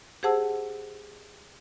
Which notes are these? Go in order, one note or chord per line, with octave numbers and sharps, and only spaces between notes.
G4 G#4 C5 F#5 A5 E6